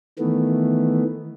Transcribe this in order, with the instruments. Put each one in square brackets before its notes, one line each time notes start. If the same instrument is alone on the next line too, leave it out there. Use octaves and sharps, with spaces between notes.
[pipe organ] D#3 E3 A3 B3